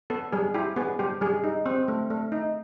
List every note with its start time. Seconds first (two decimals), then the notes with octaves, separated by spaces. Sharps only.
0.10 B3 A4
0.32 G3 G#4
0.54 E4 G4
0.76 B3 G#4
0.99 G3 G4
1.21 G3 G#4
1.44 D#4
1.66 C4
1.88 A3
2.10 A3
2.32 D#4